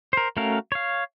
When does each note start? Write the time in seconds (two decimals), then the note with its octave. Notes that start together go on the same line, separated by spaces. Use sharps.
0.13 A#4 C5
0.37 A3 C#4 F#4 A#4 F5
0.72 C#5 F5